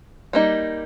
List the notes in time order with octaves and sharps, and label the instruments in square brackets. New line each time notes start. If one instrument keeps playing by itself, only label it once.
[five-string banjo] G3 A#3 D#4